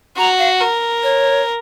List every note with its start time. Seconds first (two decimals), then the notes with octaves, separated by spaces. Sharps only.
0.18 F#4 A#5
0.39 F5
0.60 A#4
1.03 C#5